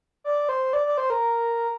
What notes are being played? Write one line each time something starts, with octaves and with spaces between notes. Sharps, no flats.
D5
C5
D5
D5
C5
A#4